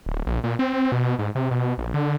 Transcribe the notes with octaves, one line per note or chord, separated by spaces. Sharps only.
D1
A#1
A#2
C4
C4
B2
G#2
C3
B2
A#1
D3